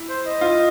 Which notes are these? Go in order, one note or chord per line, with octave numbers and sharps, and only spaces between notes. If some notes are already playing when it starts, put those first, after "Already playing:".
Already playing: E4
C5
D#5
F4